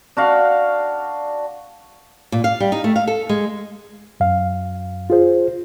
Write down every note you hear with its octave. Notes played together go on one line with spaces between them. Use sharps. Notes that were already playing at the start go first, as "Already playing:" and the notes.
D4 F#4 F5
A#2
F5
G3
D#4
A3
F5
A4
G#3
F#2 F5
F4 G#4 C5